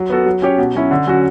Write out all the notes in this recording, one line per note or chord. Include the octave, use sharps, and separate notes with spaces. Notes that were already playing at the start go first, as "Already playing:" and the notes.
Already playing: F#3
B3 F#4 A4
F#3
C#4 G4 C#5
B2
F#3 C#4 E4
D3
F#3 C#4 F#4